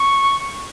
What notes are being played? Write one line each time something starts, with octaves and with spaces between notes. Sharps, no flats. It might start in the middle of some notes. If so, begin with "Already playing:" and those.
Already playing: C#6